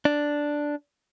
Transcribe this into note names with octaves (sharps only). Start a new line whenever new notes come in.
D4